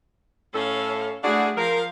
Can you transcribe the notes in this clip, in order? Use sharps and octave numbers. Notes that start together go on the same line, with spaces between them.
A2 C#4 A4 F5
A3 D4 E4 F#4 G#4
F3 A#4 F5